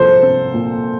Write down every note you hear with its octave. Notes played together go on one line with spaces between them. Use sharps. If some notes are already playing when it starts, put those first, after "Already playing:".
Already playing: C2 A#2 F3 A4 C5
C4
A#2